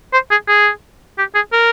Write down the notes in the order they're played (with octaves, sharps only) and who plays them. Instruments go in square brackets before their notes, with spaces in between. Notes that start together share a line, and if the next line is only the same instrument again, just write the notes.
[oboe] C5
G#4
G#4
G4
G#4
A#4